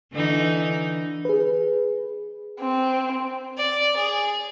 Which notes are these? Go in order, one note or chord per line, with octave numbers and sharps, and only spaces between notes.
D3 E3 D#4
G#4 B4
C4
D5
G#4